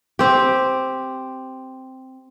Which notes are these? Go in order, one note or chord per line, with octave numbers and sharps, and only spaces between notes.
C4 G4